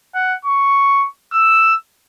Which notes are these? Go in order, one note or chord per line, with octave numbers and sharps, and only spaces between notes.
F#5
C#6
E6